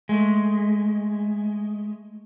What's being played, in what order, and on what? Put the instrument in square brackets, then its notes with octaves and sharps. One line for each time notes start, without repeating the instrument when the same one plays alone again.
[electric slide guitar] G#3 A3